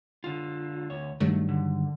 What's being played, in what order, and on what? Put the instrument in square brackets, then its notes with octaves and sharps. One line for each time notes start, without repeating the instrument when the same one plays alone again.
[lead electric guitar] D3 F4
D2 C#5
[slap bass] G2 D#3 F#3 [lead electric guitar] A3
[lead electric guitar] D3